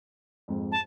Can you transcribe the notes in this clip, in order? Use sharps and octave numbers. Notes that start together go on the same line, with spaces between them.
F2 G#2
A5